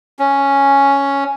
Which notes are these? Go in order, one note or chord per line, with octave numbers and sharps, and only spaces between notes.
C#4